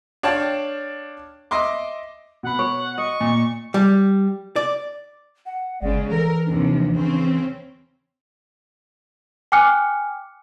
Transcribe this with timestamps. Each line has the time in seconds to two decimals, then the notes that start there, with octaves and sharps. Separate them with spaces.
0.23 D4 C#5 D5 F5 G5 A5
1.51 D#5 E5 C6 D6
2.43 B2 F#5 B5
2.59 C#5
2.98 D#5 C#6
3.21 A#2
3.74 G3
4.56 D5
5.46 F#5
5.82 G1 C#3 G#3 D5
6.11 E3 A4 A#4
6.46 D#2 C3 F3 D4
6.93 C#3 C4 C#4
9.52 G5 G#5 D6 F6 F#6 C#7